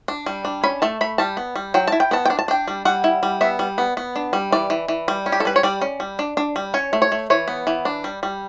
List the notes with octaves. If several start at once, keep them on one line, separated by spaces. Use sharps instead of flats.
D4
G3
D4
C#4 B5
A3 A5
A3 B5
G3 A5
B3
G3
F#3 G5
E4 A5
G5
B3 A5
G5
D4
A5
D4 G5
G3
G3 F#5
E4
G3
B3 E5
G3
B3
B3
D4
G3
E3 D5
E3
E3
G3
C#4
G4
A4
G3 B4
C#5
G3 D5
C#4
G3
D4
D4
G3
C#4 C#5
A3
C#5
A3
E3 C#5
B3
E3
D4
G3
G3